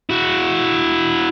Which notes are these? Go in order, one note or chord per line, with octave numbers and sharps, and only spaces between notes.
E4 F#4